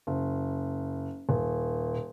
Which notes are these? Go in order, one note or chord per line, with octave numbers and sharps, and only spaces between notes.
F#1
D#1